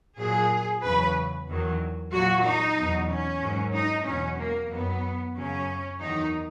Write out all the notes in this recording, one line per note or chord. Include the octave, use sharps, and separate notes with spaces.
A#2 F#3 G#4
E2 C#3 F#3 B4
E2 D#3 F#3
A#2 F#3 F#4
D#4
E2 B2 F#3
C#4
G#2 D#3 F#3
D#4
E2 B2 F#3 C#4
A#3
F#2 D#3 F#3 B3
F#2 C#3 F#3 C#4
E2 D#3 F#3 D#4